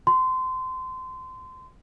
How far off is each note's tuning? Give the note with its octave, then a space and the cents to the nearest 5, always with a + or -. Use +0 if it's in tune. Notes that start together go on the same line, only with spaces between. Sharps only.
C6 -25